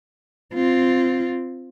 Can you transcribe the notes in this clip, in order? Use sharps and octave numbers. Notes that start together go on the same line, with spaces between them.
C4 F4